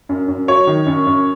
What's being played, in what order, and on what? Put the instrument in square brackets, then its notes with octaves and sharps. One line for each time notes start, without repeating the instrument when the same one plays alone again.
[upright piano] F#2
F#2
F#3 C#5
D#3
F#2
F#2